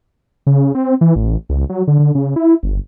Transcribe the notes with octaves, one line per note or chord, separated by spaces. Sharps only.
C#3
C4
E3
A1
C#2
F#3
D3
D3
C#3
E4
G1